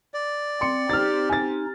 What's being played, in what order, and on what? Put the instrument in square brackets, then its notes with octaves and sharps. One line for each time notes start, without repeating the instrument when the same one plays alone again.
[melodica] D5
[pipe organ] C4 [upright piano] C6 C#7
[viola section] C4 G4 [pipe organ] D#4 [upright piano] F6 A6
[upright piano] G#5 A6